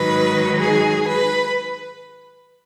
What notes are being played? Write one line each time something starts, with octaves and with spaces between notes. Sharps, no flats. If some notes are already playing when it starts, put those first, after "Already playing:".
Already playing: G#2 D#3 F#3 D#4 B4
G#4
B4